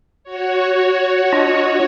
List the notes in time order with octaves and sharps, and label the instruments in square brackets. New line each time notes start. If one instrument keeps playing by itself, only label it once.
[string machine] F#4 C#5
[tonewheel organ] D4 F4 D#5